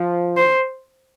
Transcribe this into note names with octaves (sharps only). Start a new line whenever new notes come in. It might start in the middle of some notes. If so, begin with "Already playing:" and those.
Already playing: F3
C5